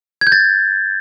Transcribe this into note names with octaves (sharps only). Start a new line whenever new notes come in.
G#6
G6
A6